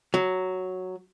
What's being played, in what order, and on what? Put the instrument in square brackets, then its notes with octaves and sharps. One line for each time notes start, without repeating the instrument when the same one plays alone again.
[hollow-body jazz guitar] F#3